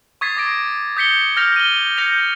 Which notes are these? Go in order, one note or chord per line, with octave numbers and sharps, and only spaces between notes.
C#6 D#6 G#6 A6 B6 C7
D6 A#6 D7
D#6 G6 B6 C#7 G7
F6 G6 A#6 F7
D#7 G7
G6 A#6 C#7 F7